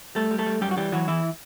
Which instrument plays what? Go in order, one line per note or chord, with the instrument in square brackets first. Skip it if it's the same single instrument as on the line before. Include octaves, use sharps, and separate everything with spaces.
[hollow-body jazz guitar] G3 A3 A4
G3
A3 A4
G3
F#2 G3 G4
F#4
E3 G3 G4
E3 F#3 F#4
E2 E3 E4